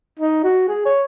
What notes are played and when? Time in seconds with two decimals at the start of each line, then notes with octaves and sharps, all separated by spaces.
0.19 D#4
0.44 F#4
0.68 G#4
0.85 C#5